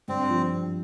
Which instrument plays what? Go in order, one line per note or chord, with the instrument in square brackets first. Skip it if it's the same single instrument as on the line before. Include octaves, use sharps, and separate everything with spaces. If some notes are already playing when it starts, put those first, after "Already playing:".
[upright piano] G2 [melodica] C4
[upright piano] F3